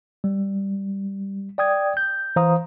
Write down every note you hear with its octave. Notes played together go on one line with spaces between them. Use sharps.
G3
D5 G5 D#6 G#6
G6
E3 C5 F5 A#5 D#6